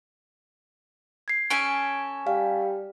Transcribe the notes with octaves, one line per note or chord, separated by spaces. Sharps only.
G#6 C7
C#4 A4 G#5 D7
G3 F5